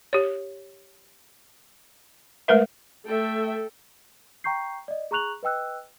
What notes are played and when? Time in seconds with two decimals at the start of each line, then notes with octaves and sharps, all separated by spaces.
0.13 G4 C#5
2.48 G#3 A3 A#4 B4 E5
3.07 A3 A4 E5 G5
4.44 G5 A#5 C#6 G6 C7
4.88 D5 D#5
5.11 G#4 A#5 C#6 F#6 F7 F#7
5.43 B4 D#5 G5 E6 F#6